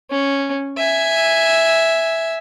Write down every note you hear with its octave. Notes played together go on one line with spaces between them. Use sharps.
C#4
E5 G#5